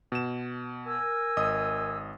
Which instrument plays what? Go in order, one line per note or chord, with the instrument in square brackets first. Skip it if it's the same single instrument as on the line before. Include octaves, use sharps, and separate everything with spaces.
[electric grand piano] B2 E7
[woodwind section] A#4 G#5 E6
[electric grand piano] G#1 D#5 D#6